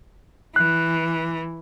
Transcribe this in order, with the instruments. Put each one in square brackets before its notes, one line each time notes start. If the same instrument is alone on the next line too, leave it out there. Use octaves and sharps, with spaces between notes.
[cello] E3 [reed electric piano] F#6